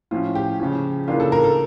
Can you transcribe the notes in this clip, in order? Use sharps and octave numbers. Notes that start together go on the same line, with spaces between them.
A2 F3 C#4 F4
G4
C#3 F3 C#4
C#3 E3 A#3 D4 F4
A4
A#4
A4